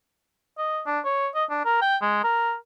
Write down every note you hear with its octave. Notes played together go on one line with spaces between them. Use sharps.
D#5
D4
C#5
D#5
D4
A#4
G5
G#3
A#4